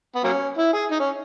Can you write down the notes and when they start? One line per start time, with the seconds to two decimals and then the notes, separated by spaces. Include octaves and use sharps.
0.15 B3
0.24 F#3 A#3 C#4
0.57 E4
0.74 G#4
0.91 D#4
1.00 C#4